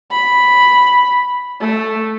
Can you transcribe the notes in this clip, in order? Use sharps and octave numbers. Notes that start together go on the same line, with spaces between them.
B5
A3